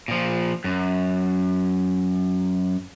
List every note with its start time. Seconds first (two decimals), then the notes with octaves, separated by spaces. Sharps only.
0.08 A#2 F3
0.64 F#2